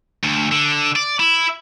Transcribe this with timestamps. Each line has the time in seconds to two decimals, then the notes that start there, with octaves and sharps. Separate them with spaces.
0.24 D2
0.52 D3
0.96 D5
1.19 E4